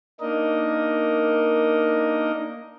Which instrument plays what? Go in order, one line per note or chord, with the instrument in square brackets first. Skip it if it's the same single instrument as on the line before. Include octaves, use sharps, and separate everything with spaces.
[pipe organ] A#3 D4 D#4 A#4 D#5